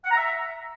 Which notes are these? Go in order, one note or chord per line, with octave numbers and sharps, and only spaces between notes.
F#5
A#5
E5